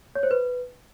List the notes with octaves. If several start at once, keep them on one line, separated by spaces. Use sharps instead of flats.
C#5
C5
B4